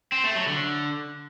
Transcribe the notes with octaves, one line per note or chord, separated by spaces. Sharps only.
C4
A3
F#3
D3